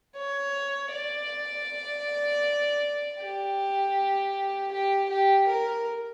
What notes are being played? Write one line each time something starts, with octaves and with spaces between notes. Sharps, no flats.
C#5
D5
G4
G4
G4
A#4